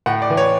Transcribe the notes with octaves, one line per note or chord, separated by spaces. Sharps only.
A2 F#5
D5
E3
C#5